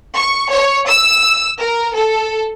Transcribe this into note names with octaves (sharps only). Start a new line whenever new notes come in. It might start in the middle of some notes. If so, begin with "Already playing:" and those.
C#6
C#5
E6
A#4
A4